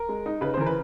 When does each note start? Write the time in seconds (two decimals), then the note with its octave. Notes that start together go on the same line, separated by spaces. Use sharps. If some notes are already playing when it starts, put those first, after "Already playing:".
Already playing: A#4
0.09 G#3
0.26 D#4
0.41 C#3 B4
0.54 C5
0.57 E3 A#4
0.66 B4